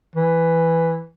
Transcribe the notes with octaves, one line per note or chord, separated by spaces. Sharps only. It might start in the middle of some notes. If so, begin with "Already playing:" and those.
E3